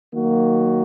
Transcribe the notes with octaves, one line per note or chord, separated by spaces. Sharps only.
D#3 F#3 A#3 F#4